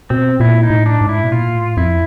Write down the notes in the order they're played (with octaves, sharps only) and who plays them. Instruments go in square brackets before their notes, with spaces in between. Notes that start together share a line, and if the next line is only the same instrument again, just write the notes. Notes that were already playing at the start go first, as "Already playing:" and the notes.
[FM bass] B2 [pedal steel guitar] C4
[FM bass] A#2 [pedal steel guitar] E4
[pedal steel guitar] D#4
[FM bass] A2
[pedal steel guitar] D4
[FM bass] G#2
[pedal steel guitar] E4
[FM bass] B2
[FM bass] A#2 [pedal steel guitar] F4
[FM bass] A2
[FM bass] F2 [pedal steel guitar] E4